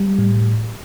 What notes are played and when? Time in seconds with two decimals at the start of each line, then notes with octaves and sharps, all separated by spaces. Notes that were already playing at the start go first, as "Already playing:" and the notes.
Already playing: G3
0.19 A2